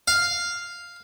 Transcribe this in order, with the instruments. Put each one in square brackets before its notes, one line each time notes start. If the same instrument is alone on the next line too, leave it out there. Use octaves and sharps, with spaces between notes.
[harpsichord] F5